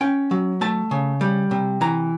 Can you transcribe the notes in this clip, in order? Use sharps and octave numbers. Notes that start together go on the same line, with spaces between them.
C#4 G5
F#3
A3 A5
C#3
G3
C3
E3 A#5